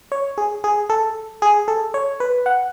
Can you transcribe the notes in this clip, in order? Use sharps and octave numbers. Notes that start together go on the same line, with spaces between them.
C#5
G#4
G#4
A4
G#4
A4
C#5
B4
F#5